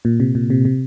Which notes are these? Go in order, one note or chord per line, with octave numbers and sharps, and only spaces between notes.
A#2
C3
A#2
C3
C3